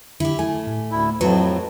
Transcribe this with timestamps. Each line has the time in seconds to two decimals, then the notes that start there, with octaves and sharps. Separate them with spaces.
0.20 D3 E4 G4
0.39 A3 G#5
0.67 A2
0.91 D2 E4
1.21 F2 A2 F#3 B4 A5